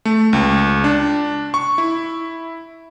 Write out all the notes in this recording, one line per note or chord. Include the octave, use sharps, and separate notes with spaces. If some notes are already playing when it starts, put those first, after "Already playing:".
A3
C#2
D4
C#6
E4